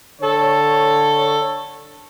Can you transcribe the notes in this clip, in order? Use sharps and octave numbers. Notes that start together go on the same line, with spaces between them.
D3 A4 C#5